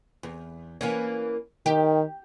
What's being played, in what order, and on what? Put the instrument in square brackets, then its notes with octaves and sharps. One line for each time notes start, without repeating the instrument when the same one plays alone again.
[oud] E2
E3 A#3 C#4
[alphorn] D#3 [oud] G4